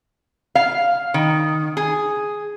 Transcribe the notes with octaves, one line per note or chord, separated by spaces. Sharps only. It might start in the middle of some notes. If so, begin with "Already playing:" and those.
F5
D#3
G#4